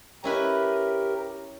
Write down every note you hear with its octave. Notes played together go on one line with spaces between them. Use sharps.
C#4 E4 G4 A#4 B4